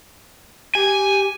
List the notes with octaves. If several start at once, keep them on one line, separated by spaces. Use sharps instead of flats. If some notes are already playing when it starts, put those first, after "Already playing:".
G4 G#5